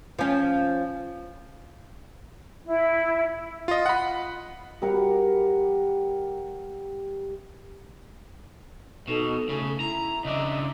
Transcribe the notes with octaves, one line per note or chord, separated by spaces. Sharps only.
F3 C#4
E4
F4 D#5
F#5 B5
G3 A#4 F#5
B2 D#4 A4
C#3 A3
E4 A#5
C#3 D4 D#5 E5